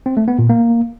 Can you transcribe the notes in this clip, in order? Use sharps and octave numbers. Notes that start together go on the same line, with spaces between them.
C4
A3
B3
A#2
A#3